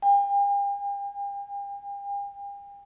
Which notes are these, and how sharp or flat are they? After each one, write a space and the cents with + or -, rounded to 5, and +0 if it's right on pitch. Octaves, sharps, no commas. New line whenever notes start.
G5 +45